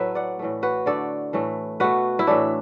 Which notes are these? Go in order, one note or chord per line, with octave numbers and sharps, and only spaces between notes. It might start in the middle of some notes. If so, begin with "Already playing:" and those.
Already playing: A2 F#3 A3 B4 E5
D5 F#5
A2 E3 A3
F#4 B4
D3 A3 A4 D5
A2 E3 A3
B2 A3 F#4 B4
E4
A2 E3 A3 D4